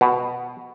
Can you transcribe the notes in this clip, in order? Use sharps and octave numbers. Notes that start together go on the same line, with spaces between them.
B2